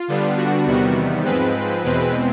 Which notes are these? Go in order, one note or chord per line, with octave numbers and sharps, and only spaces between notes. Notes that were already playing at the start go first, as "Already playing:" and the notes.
Already playing: F4
D3 G3 B3 D4
F#4
E2 C3 D#3 G3 B3 F#4
G#2 F3 G#3 C4 B4
E2 B2 G#3 C4 B4